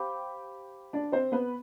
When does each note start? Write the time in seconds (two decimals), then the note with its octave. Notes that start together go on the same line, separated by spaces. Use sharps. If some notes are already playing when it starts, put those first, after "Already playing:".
Already playing: G4 C5 F5 G5 B5 D6
0.93 D4 D5
1.12 C4 C5
1.32 B3 B4